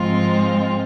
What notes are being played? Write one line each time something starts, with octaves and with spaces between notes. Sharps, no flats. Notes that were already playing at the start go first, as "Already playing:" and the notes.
Already playing: G#2 F3 G#3 C4 F4